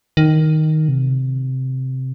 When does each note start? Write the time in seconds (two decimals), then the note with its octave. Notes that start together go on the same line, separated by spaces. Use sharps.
0.17 D#3
0.89 C3